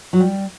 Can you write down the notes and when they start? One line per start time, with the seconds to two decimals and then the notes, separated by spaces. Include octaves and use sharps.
0.13 F#3
0.20 G3